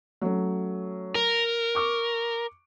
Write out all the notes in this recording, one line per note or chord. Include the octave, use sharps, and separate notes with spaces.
F#3 A3 C#4
A#4
C#6 D6